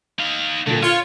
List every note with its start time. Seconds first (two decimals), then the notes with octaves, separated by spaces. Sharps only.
0.19 D#4 F5
0.66 G2 A#2 D3
0.83 F4 C#5 F6